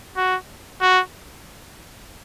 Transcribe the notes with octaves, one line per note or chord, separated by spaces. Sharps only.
F#4
F#4